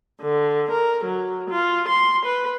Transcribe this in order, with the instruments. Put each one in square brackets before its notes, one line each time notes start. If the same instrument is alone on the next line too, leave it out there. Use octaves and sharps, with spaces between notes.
[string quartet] D3
A#4
F#3
F4
C6
B4